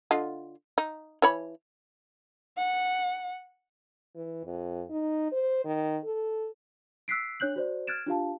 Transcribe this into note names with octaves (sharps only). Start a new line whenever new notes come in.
D3 F4 D#5
D#4
E3 C#5 B5
F#5
E3
F2
D#4
C5
D#3
A4
E6 F#6 B6 C7 D7
D4 C#5 F#6 G6 F#7
F#4 C5 D5
F6 F#6 G#6 A6 D7 E7
D4 F4 G4 F5 A5